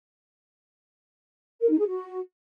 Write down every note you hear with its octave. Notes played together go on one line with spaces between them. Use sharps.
A#4
D#4
G#4
F#4